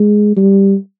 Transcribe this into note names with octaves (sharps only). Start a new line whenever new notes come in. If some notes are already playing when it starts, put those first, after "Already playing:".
Already playing: G#3
G3